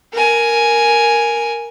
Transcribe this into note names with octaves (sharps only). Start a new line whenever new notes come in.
A#4 G#5